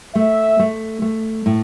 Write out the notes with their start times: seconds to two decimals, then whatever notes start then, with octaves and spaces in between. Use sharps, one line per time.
0.15 A3 E5
0.59 A3
1.02 A3
1.46 A2